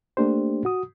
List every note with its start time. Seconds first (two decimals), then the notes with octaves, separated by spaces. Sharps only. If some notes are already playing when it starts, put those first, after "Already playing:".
0.17 A3 A#3 D4 G4 C5
0.65 F#4 D#6